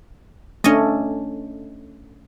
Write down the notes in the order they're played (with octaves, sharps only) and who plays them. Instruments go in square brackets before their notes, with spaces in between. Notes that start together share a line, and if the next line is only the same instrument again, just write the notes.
[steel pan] A3 D4 [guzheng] C#4 D#5